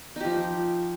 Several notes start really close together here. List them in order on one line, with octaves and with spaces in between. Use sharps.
D#4 G4 F3